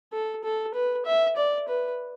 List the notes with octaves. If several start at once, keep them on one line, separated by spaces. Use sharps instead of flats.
A4
A4
B4
E5
D5
B4